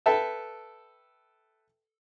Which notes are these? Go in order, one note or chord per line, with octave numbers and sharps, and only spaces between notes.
A4 B4 E5 G5 A5